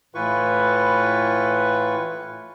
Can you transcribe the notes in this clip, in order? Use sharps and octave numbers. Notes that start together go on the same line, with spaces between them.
A2 E3 E4 F4 B4 C#6